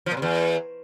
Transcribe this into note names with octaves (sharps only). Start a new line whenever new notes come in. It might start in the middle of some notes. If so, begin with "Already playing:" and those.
F3
A#2
C3
E2